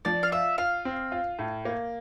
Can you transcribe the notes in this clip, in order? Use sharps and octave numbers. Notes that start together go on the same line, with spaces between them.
F3 D5
F5
F4 E5
F4 F5
C4
F4
A2
A#3